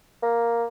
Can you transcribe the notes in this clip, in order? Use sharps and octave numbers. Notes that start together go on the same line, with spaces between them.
A#3